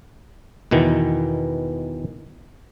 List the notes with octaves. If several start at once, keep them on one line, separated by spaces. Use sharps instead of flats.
E2 B2 D#3 E3